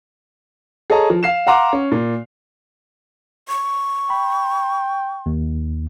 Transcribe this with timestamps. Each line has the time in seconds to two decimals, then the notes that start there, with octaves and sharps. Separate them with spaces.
0.90 G#4 A4 C#5 D#5 A5 A#5
1.10 F3
1.23 F5 C7 E7
1.47 F5 F#5 A#5 C6 D6
1.73 C#4
1.92 A#2
3.49 C#6
4.10 G5 B5
5.26 D#2